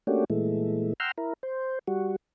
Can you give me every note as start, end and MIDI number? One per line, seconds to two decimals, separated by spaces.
0.07 0.25 57
0.07 0.25 58
0.07 0.25 61
0.07 0.25 62
0.07 0.25 66
0.07 0.25 67
0.30 0.93 46
0.30 0.93 52
0.30 0.93 56
0.30 0.93 57
1.00 1.11 78
1.00 1.11 79
1.00 1.11 82
1.00 1.11 84
1.00 1.11 88
1.00 1.11 89
1.18 1.33 64
1.18 1.33 70
1.43 1.79 72
1.88 2.16 55
1.88 2.16 66